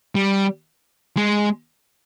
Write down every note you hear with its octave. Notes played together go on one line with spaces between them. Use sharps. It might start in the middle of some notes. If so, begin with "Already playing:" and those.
G3
G#3